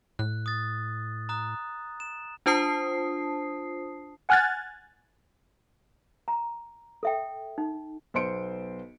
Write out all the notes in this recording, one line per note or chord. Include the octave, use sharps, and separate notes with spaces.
A2 F#6
D#6 A6
A#5 D#6 F#6
E7
D4 F4 C5 A5 D#6 C7
F#5 G#5 F6 F#6 G#6 A6
A#5
A4 E5 G5
D#4
B1 B3 C5 C6 C#7 D7